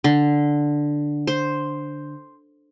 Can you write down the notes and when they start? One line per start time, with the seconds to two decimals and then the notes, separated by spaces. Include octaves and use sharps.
0.04 D3
1.27 C5